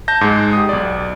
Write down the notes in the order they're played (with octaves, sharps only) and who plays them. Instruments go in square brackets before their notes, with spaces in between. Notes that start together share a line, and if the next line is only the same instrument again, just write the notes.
[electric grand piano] A5 G6 A#6
G#2 G#3
G4 D#6
B1 D5